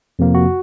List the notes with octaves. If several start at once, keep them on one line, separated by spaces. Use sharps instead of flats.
F2 C3 F3 A#3
F#4